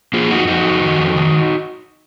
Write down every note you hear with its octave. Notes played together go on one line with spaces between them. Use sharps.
A#3 F4 G#4
F2 D#4 F#4
F2 D#4 F#4
F2
D#3
F2
D#3